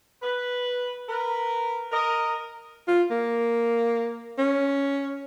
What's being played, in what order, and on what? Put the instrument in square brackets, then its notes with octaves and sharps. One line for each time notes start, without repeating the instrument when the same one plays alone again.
[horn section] B4
A#4 B4
A#4 D#5
[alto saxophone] F4
A#3
C#4